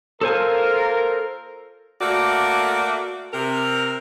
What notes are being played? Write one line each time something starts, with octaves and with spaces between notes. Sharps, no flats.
A#3 F4 A4 A#4 C5 G#5
A3 A#3 F#4 D5
C3 A#4